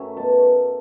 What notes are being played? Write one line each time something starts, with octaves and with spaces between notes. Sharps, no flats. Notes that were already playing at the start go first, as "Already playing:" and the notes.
Already playing: F#2 F#3 A3 C#4 E4
B2 A5